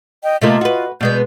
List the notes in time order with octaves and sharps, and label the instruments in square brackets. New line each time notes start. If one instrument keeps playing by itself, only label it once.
[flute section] D#5 G5
[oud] C3 A3 A#3 [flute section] F4 D#5
[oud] F#4 B4
[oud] B2 G#3 B3 [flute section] D5 G6